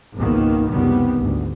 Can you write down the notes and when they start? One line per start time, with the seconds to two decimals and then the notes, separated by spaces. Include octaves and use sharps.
0.16 G#1 C#2 B2 D#3 A#3 B3
0.68 F#1 C#2 C3 D#3 G3 B3
1.19 G#1 D2 G#2